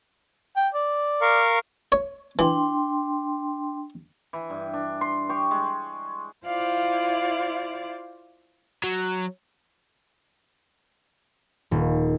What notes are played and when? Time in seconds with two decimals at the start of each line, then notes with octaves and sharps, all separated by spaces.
0.56 G5
0.74 D5
1.22 A#4 F5 C#6
1.92 C#5
2.39 E3 D4 G5 C6
4.33 E3
4.50 G2
4.74 D4
5.01 C6
5.29 G4 C#6
5.51 G#3
6.45 E4 F4 C5 D5 F5
8.84 F#3
11.71 D#1